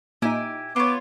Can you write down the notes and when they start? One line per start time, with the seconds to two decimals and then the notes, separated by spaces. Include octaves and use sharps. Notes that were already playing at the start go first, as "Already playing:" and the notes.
0.22 A#2 D#4 E4 G4 G#5
0.76 B3 F4 C#5 D6